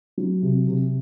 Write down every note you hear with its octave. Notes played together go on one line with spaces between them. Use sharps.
F#3
C3
C3